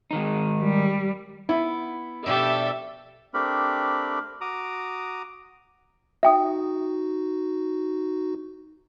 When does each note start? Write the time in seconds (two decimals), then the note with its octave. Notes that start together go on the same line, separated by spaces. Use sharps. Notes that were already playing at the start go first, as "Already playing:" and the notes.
0.11 G#2 D#3 D#4
0.61 G3
1.49 B3 E4
2.26 B2 F3 D4 G4 A4 E5
3.34 A3 C4 D4 G4 A#4 B5
4.41 F#4 A#5 D6 D#6
6.23 D#4 F#4 E5 G5 D#6